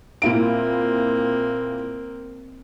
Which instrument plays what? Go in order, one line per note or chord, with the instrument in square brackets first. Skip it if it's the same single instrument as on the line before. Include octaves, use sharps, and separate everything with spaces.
[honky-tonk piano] A#2 E4 D7 [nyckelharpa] A#3 C4